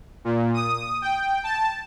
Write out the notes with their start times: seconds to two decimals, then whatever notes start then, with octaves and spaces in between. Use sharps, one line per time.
0.25 A#2
0.54 D#6
1.02 G5
1.44 A5